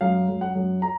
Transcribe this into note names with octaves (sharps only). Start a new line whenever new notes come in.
F#2 F5
F#2
F#5
F#2
A#5